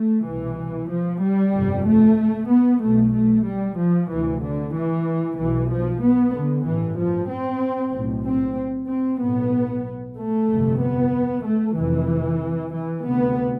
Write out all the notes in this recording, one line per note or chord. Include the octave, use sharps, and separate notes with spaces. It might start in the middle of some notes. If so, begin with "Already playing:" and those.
Already playing: A3
C2 B2 E3
F3
G3
G1 F2 C3
A3
B3
B1 B2 A3
A3
G3
F3
D2 C3 E3
D3
E3
B1 B2 E3
F3
B3
D3
A1 G2 E3
F3
C4
B1 A2
C4
C4
B1 A2 B3
A3
G1 F2 C3
B3
A3
F1 F2 C3 E3
E3
D2 C3 B3